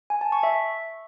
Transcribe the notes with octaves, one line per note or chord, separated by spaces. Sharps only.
G#5
A5
C#6
E5